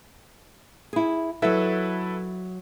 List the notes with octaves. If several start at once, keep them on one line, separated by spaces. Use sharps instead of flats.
E4 G#4
F#3 E4 A4 B4 E5